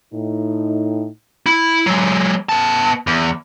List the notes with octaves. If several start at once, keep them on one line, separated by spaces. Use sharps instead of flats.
A2 D#4
E4
F#3 G#3
B3 A5
E2